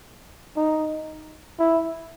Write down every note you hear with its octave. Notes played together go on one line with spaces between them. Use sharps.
D#4
E4